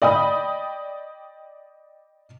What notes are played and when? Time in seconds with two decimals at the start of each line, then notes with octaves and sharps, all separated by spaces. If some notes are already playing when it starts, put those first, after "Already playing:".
0.02 D5 D#5 G5 B5 D#6